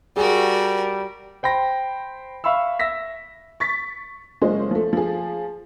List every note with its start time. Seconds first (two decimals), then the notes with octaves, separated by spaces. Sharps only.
0.17 G3 F#4 G#4 A#4
1.43 C5 G5 B5 A#6
2.44 E5 F5 B5 C#6 E6
2.79 E5 E6 A#6 B6
3.60 C#6 A6 B6
4.42 F#1 G#3 C#4 F4 C5 D#5
4.71 F3 A3
4.93 F3 G#4